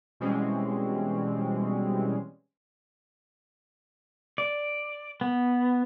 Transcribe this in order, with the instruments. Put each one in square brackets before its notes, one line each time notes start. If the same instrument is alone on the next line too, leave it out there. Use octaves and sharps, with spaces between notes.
[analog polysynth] B2 E3 G3 G#3 C4 C#4
[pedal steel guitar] D5
B3